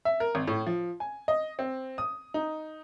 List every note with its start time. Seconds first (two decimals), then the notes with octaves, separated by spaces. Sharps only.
0.05 E5
0.20 A#4
0.35 G#1
0.47 A2
0.66 F3
1.00 G#5
1.28 D#5
1.59 C4
1.98 D#6
2.34 D#4